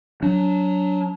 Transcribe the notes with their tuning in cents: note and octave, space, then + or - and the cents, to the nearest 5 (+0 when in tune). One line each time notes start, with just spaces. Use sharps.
F#3 +0 D4 -25